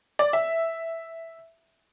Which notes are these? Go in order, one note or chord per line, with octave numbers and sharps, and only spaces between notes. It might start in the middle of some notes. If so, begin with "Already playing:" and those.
D5
E5